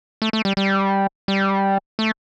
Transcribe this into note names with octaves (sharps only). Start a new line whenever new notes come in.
A3
A3
G3
G3
G3
A3